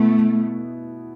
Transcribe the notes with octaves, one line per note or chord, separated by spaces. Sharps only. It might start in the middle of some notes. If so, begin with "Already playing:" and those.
Already playing: B2 A3 B3 E4